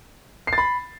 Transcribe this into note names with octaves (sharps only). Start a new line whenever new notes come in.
C7
A6
B5